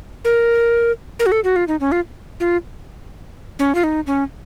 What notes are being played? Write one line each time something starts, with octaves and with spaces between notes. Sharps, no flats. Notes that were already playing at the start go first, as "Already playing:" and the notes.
A#4
A#4
F#4
A4
F#4
F4
D#4
C#4
F4
F4
C#4
F4
D#4
C#4